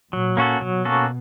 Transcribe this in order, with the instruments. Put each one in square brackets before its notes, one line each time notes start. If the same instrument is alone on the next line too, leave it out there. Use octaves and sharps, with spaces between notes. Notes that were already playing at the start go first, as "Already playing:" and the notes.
[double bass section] A#2 [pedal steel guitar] F#3
[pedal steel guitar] A#3 C#4 F#4 A4
[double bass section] B2 [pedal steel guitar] F#3
[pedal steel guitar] A#3 C#4 F#4 A4